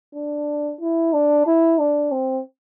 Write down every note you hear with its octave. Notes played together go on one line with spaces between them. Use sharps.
D4
E4
D4
E4
D4
C4